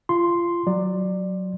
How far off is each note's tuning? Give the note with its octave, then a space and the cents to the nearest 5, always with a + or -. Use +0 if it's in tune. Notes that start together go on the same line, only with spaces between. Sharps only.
F4 -25 C6 +0
F#3 +0 D5 +10